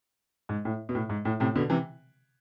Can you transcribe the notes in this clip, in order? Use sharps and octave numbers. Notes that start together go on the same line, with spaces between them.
G#2
A2
B2
A2
G#2
A2
A2 C3
B2 D3
C3 E3